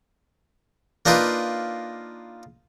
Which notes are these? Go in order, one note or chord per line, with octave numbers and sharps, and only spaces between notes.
A#3 D4 D#4 F4 B4